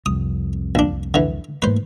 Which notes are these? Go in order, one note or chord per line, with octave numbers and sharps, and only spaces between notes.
C2 F2 D#6
A#1 D4
D3 E3
G#2 A3 A#3 B4 C5